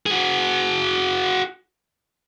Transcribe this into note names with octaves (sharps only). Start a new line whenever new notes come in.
F#4 G#4